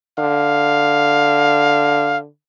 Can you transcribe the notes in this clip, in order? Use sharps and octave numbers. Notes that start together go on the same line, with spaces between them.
D3 F5